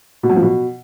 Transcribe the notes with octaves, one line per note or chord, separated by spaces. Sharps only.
B2
F#2
F3
B2